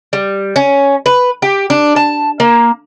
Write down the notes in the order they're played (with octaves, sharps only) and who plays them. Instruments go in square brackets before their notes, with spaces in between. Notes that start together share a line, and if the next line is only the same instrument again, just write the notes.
[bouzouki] G3
C#4
B4
G4
D4
A5
A#3